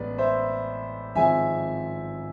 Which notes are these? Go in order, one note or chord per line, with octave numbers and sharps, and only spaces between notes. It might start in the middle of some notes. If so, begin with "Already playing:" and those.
Already playing: A1 A2 G#3 B3 B4 D5
C5 E5
G#1 G#2 F3 G#3 C4 E5 G#5